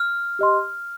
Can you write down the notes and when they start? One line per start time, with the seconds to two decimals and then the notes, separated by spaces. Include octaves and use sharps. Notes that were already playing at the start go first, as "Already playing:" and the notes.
Already playing: F6
0.39 G4 D#5 C6